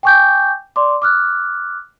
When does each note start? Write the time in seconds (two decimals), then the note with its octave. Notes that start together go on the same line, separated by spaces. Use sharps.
0.03 G5 G#5 C#6 D6 G6
0.76 D5 C6 D6
1.02 D6 F6 F#6